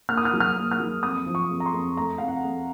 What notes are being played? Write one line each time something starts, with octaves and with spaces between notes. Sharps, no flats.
A#3 F6
D#6
F6
F#3
F6
A#3
F6
F#3
F2 D#6
F3
C#6
F2
A#5
C6
F2
A3 A#5
F2 F5
F#5
F2